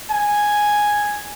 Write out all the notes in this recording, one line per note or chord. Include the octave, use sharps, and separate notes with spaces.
G#5